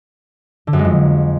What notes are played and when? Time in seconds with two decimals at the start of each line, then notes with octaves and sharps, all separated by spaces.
0.67 D3
0.73 F#2
0.79 G#3
0.85 F2